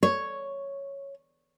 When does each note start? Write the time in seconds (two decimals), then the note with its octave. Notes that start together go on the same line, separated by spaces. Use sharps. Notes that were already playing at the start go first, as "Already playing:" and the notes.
0.03 C#5